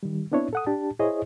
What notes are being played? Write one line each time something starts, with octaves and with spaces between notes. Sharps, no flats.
D#3 G3
B3 C4 D4 E4 C#5
A4 F#5 D#6
D4 G4 A5
E4 G#4 C5 C#5 D#5